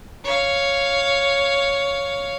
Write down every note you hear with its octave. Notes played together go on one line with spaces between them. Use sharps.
C#5 F5